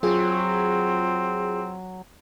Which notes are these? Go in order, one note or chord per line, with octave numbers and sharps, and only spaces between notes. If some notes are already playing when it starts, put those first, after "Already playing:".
F#3 C4 F4 G#4